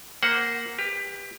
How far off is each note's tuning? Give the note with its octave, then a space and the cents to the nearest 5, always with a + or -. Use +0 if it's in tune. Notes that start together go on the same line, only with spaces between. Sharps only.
A#3 +0 C5 -10 F#5 +0
G4 +25 B4 -5